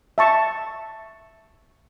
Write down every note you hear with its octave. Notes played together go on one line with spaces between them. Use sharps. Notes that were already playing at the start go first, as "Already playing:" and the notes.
E5 A5 C#6